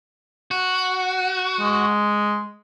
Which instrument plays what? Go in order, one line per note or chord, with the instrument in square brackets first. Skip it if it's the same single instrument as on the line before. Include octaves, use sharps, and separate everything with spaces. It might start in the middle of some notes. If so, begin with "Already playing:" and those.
[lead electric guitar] F#4
[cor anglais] G#3